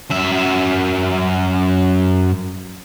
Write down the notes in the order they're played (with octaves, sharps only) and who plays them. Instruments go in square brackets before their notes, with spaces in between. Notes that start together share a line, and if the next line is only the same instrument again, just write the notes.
[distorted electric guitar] F#2 E5